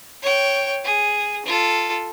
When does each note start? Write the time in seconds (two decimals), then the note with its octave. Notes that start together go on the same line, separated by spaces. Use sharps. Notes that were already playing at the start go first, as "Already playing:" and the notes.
0.22 C#5 G5
0.84 G#4
1.45 F4 A4